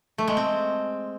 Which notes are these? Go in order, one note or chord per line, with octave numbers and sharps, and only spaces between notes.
A3
G#3
C4